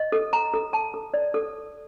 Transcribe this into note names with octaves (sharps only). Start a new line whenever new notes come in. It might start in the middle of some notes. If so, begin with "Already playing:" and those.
Already playing: D#5
A4
A#5
A4
A5
A4
D5
A4